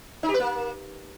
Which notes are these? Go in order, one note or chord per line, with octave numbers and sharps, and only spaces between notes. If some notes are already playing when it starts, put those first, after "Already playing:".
D#4
G4
B4
A#3